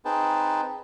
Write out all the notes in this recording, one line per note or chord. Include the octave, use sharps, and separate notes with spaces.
C4 D#4 G#4 B4 G5 A5